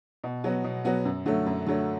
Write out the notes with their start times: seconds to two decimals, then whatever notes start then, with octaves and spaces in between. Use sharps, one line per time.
0.24 B2
0.44 F#3 B3 F#4
0.64 B2
0.85 F#3 B3 F#4
1.05 F#2
1.26 D3 F#3 A3
1.46 F#2
1.67 D3 F#3 A3